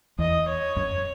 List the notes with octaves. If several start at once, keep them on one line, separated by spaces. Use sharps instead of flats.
E2 D#5
C#5
F#2